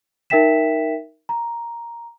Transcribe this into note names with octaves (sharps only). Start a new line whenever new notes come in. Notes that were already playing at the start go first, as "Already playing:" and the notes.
D#4 A#4 E5 G5 B6 E7
A#5